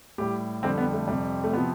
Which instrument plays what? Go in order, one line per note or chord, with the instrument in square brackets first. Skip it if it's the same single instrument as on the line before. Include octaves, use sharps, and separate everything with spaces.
[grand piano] A2 G3 G4
F2 D3 G3 C4
B3
A3
F2 C3 G3
A3
C3 F3 B3